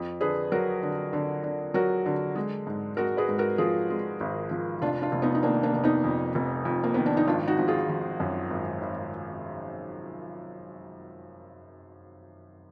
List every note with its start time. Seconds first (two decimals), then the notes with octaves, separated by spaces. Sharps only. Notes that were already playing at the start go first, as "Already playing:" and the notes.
Already playing: F2
0.21 D3 G#4 B4
0.52 F#3 F#4 A#4
0.83 D3
1.13 D3
1.43 D3
1.74 F#3 F#4 A#4
2.06 D3
2.35 G#3
2.67 G#2
2.97 G#3 F#4 A#4
3.17 G#4 B4
3.29 G#2
3.38 F#4 A#4
3.58 F3 F4 G#4
3.90 G#3
4.20 G#1
4.51 F3
4.81 F1 D4 F4
5.02 D4 F4
5.12 F1
5.22 B3 D#4
5.35 D#4
5.43 D#3 A#3 D4
5.63 A#3 D4
5.73 F1
5.84 B3 D#4
6.04 F2
6.35 F1
6.65 F2
6.84 A#3
6.94 D#3 B3
7.06 D4
7.17 D#4
7.27 G#1 D4 F4
7.48 D#4 F#4
7.59 F3
7.68 F4 G#4
7.89 F3
8.20 F#2
8.50 G#1
8.81 G#1